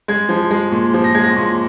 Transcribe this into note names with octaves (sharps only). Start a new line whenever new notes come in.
G#3 G#6
F3
G#3
A#2
F3
A#6
G#3 G#6
A#6
A#2